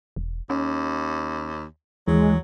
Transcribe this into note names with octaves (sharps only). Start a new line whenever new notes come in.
E1
D#2 C#4
D#2 E3 F#3 G#3